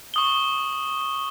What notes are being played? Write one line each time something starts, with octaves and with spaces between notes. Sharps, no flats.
C#6 D#6 G7